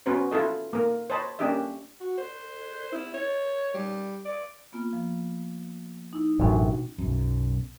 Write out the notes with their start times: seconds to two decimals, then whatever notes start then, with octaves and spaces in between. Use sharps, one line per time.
0.06 B3 C#4 F#4 B4 C5
0.31 E4 F4 A4 D#5
0.73 A#3 A#4
1.10 C5 C#5 D#5 A5 B5
1.39 A#3 C#4 D4 G4 D#5 E5
2.00 F#4
2.18 C5
2.92 E4
3.14 C#5
3.74 G3
4.25 D5
4.72 A#3 B3 F4
4.93 F3
6.13 D#4 E4
6.39 A1 F#2 B2 D4 F#4
6.98 B1 F#2